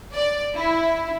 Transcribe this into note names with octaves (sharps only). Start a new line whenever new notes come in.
D5
E4